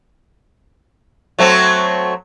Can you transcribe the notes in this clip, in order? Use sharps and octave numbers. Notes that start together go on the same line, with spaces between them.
F#3 A3 C4